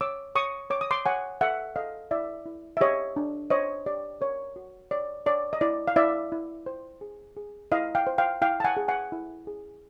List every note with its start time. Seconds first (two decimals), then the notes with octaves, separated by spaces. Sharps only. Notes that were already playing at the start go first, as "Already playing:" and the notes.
0.01 C#5 D6 E6
0.35 C#5 C#6 D#6
0.70 C#5 D6
0.81 D#6
0.91 C6 D6
1.06 C#5 F#5 G#5
1.41 A4 E5 F#5
1.76 A4 D#5 F5
2.11 E4 D5 E5
2.46 E4
2.77 E5
2.81 G4 C#5 D#5
3.16 D4
3.50 C5 C#5 D#5
3.86 G4 D5
4.21 A#4 C#5
4.56 F#4
4.91 C#5 D5
5.26 C#5 D5
5.53 D#5
5.61 E4 D5
5.88 F5
5.96 E4 D5 E5
6.32 E4
6.66 C5
7.01 G#4
7.37 G#4
7.72 E4 D#5 F5
7.95 F5 G5
8.07 C5
8.18 F5 G5
8.42 E4 F5 G5
8.60 A5
8.64 F#5 G#5
8.77 G#4
8.88 F#5 G#5
9.12 E4
9.47 G#4